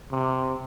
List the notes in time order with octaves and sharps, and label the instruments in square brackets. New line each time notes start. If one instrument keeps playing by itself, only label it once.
[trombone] C3